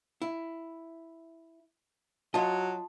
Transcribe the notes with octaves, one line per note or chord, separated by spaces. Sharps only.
E4
F#3 F4 D#5 A5